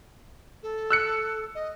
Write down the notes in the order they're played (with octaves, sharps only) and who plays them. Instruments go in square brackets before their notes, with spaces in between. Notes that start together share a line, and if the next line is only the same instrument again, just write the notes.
[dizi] A4
[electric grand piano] E6 F#6 C#7
[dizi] D#5